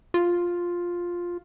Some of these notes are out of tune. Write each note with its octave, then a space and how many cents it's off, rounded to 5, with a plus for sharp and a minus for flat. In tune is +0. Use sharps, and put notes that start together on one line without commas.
F4 +5